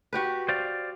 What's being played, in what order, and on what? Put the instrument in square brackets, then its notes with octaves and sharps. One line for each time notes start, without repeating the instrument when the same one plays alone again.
[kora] F#4 G4 B4
[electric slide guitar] C5 D5 F5